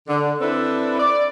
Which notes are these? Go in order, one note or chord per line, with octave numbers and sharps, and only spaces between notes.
D3
C4 D4 E4 A4 B4
D5